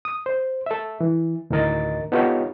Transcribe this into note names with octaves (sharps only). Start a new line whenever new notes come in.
D#6
C5
A4 E5
E3
D2 A2 D#3 A#4 D#5 A6
B3 D#4 F4 G4 A4 C#5